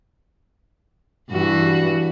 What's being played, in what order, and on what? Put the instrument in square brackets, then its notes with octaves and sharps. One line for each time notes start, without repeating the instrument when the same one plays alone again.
[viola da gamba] G2 E3 F#4